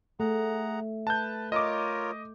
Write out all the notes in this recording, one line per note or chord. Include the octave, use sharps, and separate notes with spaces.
A3 G#4 F#5 A#5
B4 A5 G6
F4 A#4 C#5 D#5 D6